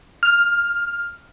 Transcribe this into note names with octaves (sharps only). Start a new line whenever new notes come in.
F6